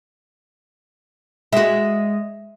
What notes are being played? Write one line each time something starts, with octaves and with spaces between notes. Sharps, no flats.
G#3 F#4 E5